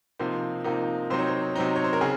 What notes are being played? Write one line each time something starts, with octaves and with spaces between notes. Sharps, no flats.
C3 F3 A#3 D#4 C5
C3 F3 A#3 D#4
C3 F#3 C4 D#4 C5
C#5
C5
C3 F#3 C4 D#4
C#5
C5
A#4
C#3 G#4